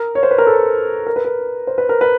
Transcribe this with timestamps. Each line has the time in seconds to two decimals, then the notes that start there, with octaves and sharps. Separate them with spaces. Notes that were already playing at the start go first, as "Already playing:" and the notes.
Already playing: A#4
0.15 C#5
0.23 C5
0.31 B4
0.38 A#4
0.47 A4
1.07 A#4
1.16 B4
1.25 A#4
1.67 C5
1.78 B4
1.89 A#4
2.01 B4